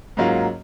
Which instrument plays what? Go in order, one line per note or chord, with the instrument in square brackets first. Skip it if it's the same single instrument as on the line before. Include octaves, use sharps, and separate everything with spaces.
[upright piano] G#2 F#3 A#3 C#4 F4